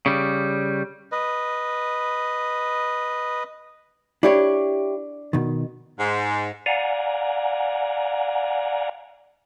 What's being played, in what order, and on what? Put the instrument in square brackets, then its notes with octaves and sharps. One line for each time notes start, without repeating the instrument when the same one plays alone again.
[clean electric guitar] C#3 G3
[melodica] B4 D#5
[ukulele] D4 [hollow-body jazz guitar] E4 G4 C#5
[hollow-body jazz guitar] B2 D#3
[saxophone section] G#2
[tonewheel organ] D5 F5 F#5 G#5 A#5